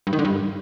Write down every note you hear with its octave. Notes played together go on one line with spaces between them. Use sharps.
G2
D#3
D3
G2